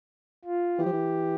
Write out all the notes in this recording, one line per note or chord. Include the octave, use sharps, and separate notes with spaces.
F4
E3 G4
F3
E3